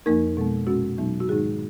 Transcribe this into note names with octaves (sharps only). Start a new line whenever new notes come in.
F2 F3 A#3 D#4 A#4
B2 G#3 B3
A#2 G#3 C#4 F#4
B2 F#3 B3 D#4
F#4
G#2 D#3 G#3 D#4 G#4